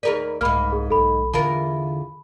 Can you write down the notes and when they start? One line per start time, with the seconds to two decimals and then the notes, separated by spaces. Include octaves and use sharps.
0.03 D#2 G#4 A#4 B4 D5
0.41 C2 G#2 A#3 B5 F6
0.72 G#4
0.90 B1 A4 B5
1.33 E2 D3 F4 A#4 A5 B5